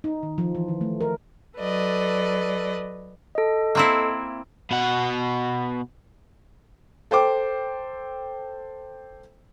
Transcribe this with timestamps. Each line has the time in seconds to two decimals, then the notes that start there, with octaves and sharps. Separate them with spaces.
0.04 D#4
0.23 D#3
0.38 F3
0.55 E3
0.68 D#3
0.81 A3
1.01 A#4
1.58 F#3 A4 B4 D5 D#5
3.35 A4 D#5
3.75 A#3 C4 E4
4.71 B2 F#5
7.11 A4 C5 G5 D6